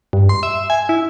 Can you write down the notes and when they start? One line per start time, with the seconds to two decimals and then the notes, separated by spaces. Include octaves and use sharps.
0.13 G2
0.29 C6
0.43 E5
0.70 G#5
0.89 E4